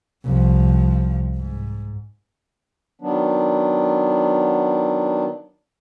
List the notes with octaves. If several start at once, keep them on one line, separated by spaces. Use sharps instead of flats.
C2 F3
G#2
D#3 F#3 B3 D4